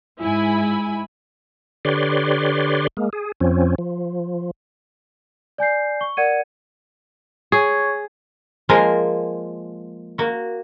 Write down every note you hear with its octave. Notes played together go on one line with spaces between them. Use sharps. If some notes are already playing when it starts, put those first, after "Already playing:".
G#2 E4 G#5 B5
D3 G4 B4 C#5 D5 C6
G#3 A#3
G#4
F2 F3 C4 C#4
F3
D5 G#5 G6 C7
C#6 G7
A#4 D5 F#5 G#6 C#7 D#7
G#4 C#5 C#6 G#6
F3 G#3 A#3 F4 G#4 A#4
A#3 F#4